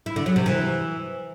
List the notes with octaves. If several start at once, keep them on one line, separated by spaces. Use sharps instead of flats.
E4
D3
F#3
C3
E3